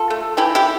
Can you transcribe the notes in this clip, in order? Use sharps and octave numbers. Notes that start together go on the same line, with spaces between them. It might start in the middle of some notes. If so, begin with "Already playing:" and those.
Already playing: F4 A4
A3
E3 E4 G4
E4 G4